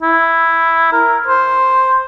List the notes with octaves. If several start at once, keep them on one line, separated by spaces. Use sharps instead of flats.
E4
A#4
C5